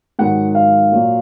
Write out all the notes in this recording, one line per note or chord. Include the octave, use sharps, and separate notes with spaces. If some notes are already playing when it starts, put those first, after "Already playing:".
G#2 D#3 F#3 F#5
F5
A#2 F#3